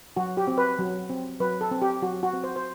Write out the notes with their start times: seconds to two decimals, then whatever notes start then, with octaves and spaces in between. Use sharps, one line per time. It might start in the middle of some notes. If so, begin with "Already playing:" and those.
0.16 F#3 F#4
0.37 G4
0.47 C4
0.58 B4
0.79 F#3
1.09 C4
1.40 F#3 B4
1.61 A4
1.71 C4
1.82 G4
2.02 F#3 F#4
2.23 F#4
2.33 C4
2.44 C5
2.56 C5